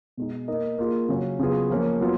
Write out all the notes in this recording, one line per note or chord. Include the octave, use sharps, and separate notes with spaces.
B2 G#3 D#4
A#3 D#4 A#4 D#5
A#3 F4 G#4
C#3 F#3 C#4
C#3 F#3 B3 F4 G#4
F3 A#3 C#4
F#3 B3 F4